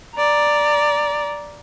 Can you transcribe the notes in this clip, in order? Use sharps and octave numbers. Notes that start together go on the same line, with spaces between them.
D5 A#5